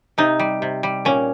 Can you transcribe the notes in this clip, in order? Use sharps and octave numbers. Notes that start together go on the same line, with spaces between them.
C3 D#4
G3
C3
G3
A#2 C#4